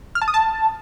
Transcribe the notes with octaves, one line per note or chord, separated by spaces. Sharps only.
F6
A5
D#6
A5